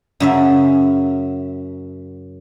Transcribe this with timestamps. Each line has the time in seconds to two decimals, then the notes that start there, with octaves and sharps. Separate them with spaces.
0.20 F#2 C#3 E5